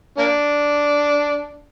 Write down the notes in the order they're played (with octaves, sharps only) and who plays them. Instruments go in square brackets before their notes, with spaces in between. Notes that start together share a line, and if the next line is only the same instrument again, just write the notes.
[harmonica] A#3 D4